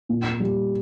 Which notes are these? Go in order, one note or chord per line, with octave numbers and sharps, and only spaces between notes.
A#2
G3